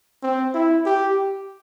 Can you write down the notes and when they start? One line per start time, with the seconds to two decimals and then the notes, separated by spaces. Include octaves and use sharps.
0.23 C4
0.54 E4
0.86 G4